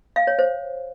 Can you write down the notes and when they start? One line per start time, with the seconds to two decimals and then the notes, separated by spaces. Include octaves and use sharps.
0.16 F5
0.27 C#5
0.39 C5